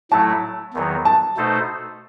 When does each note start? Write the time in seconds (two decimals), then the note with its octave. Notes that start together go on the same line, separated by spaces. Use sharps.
0.11 A2 F#3 A3 E4 A5
0.74 E2 D#3 F#3
1.05 A5
1.37 B2 A3 D#4 A4 C5